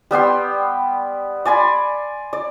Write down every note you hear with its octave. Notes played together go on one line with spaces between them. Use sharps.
G3 B3 G5 C6
D5 G#5 B5 C6
D5